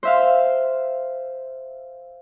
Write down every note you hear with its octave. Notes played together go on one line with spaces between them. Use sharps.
C5 E5 F5